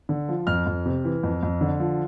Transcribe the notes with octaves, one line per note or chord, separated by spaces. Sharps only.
D3
F3
F2 F6
F2
C3
E3
F2
F2
D3
F3